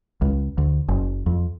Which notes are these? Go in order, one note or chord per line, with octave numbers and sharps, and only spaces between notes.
C#2
D2
F#1
F2